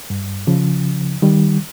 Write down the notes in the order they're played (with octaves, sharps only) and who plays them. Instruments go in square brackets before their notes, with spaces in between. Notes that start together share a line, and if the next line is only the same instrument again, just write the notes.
[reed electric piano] G2
C#3 F3
D#3 G3